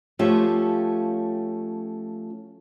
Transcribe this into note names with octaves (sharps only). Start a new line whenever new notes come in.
F3 A3 C#4 F4 G4 E5